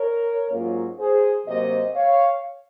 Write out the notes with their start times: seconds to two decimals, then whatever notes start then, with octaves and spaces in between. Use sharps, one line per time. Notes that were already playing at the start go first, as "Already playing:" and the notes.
Already playing: A#4 C#5
0.51 G#2 F#3 A#3 C#4 F4
0.99 G#4 C5
1.47 C3 F#3 A#3 C5 D#5
1.95 C#5 F5